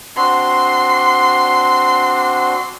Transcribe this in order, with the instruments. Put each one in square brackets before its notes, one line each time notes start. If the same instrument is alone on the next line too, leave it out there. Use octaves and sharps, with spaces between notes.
[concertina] C4 D4 F#4 [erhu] C6